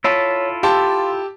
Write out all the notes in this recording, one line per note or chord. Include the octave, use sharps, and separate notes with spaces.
E4 F4 A4 C#5 B6
G4 F5 A5 C6